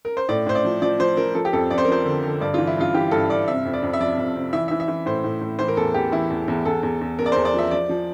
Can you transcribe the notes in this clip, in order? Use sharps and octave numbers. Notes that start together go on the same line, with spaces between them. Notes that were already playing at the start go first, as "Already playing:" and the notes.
A#4
C5
A2 D5
A2 C5
D5
F3
F3 D5
F3 C5
F3 A#4
F3 A4
G4
F2 A4
F2 D5
C5
A#4
F3 C5
D3
D3
G2 D5
F4
E3
E4
G2 F4
E3 G4
G2 A4
G2 D5
C3 E5
F2
D5
F2
E5
F3 D5
F2
C3
E3 E5
E5
E3
E5
E3
A2 C5
A2
A2
E3 C5
A#4
E2 A4
E2 G4
E3 E4
E2
E2
E2 A4
E2
E2
E2 A#4
D5
E2 C5
D5
F3 E5
F3 D5
F3